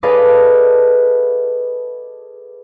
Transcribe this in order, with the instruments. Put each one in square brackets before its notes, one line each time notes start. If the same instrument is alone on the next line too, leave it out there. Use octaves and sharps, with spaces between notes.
[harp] G#4 A4 B4 D5 D#5 F5